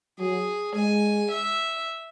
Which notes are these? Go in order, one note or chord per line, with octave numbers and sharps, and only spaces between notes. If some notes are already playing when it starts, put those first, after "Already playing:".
F#3 G#4
G#3 G#5
E5